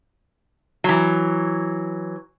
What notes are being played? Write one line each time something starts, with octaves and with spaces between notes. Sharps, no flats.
E3 F#3